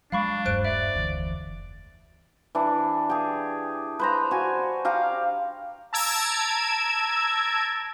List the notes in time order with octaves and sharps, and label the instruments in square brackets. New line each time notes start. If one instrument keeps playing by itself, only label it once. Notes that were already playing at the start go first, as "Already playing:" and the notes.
[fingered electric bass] F#3 G#3 [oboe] D4 [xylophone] F5 B5 C#6
[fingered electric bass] D#1 G2 [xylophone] C5 F#6 D7
[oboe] D5 [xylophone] E5
[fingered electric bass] F1 D2 E3
[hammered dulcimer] E3 D4
G4 G#4
B4 C5 A#5
F#4 G#5
G4 F5 A#5
[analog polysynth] A5 A#5 E6 G#6 D7